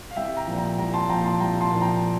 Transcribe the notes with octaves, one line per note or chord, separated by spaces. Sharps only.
F5
C2 E5 G5
G5 A#5
A#2 F3
G5 A#5
C2 G5 A#5
A5 C6
A#2 F3 G5 A#5
A5 C6
C2 G5 A#5
A5 C6
A#2 F3
G5 A#5